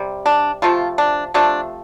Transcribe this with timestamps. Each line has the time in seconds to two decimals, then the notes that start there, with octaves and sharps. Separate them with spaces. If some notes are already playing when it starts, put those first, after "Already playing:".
Already playing: C3 G3
0.26 D4
0.62 C3 F3 A3 F4
0.98 D4
1.34 C3 F3 A3 D4